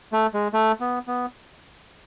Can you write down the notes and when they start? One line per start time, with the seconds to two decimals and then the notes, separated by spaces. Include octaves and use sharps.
0.13 A3
0.34 G#3
0.53 A3
0.80 B3
1.07 B3